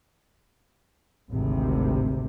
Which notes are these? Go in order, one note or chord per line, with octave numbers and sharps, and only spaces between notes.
G#1 D2 C3